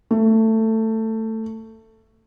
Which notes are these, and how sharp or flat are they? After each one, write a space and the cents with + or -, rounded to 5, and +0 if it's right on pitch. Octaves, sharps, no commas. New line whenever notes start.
A3 +15